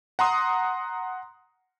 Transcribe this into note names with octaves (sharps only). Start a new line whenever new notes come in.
F#5 A#5 C6 D#6